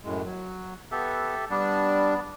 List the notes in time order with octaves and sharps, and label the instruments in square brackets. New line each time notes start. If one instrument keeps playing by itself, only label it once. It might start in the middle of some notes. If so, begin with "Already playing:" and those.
[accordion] F#2 A2 G#3
F#3
[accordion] B3 [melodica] G4 A4 E5
[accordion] G3 D4 [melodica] B3 D5